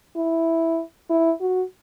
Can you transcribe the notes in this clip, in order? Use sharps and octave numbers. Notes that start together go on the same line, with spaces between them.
E4
E4
F#4